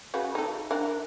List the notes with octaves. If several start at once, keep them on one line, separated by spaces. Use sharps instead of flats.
C#3 F#4 B4
D#4 A4
D4 A#4 F#5